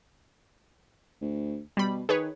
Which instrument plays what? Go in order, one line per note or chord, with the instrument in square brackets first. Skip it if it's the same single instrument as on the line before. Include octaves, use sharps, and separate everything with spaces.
[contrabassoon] D2
[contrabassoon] B2 [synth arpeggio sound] G3 B5
[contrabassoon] D#3 [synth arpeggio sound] G#4 B4 C#5